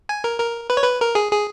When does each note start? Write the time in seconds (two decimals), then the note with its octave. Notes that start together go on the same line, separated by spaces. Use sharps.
0.09 G#5
0.24 A#4
0.40 A#4
0.70 B4
0.77 C#5
0.83 B4
1.00 A#4
1.15 G#4
1.31 G#4